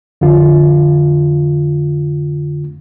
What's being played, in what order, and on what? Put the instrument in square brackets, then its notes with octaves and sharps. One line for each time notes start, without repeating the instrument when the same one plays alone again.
[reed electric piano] F2 D3 F4